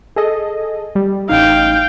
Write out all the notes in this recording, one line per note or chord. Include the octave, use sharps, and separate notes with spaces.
G#4 A4 D#5
G3
A1 D#4 F5 G5